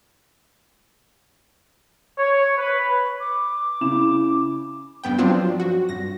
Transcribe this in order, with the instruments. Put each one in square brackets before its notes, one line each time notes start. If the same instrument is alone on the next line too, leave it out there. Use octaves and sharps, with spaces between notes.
[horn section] C#5
B4
[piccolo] D6
[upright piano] C#3 E4 E7
[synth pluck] G2 B3 G5
F3 F#3 C4 D4 F4
F#4
G2 A#6